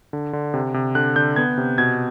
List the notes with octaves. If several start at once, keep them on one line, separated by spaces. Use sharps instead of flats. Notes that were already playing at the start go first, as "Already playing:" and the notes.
D3
D3
C3
C3
D3 F#6
D3 G6
B3 G#6
C3
B2 G#6